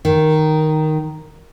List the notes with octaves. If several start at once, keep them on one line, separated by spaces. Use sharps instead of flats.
D#3